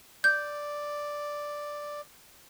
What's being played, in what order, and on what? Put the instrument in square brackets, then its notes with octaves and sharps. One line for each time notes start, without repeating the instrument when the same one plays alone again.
[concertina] D5 [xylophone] G6